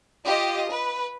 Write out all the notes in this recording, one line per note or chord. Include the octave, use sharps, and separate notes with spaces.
F4 G4 D#5
B4